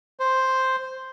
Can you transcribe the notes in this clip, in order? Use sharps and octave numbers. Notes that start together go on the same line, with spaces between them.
C5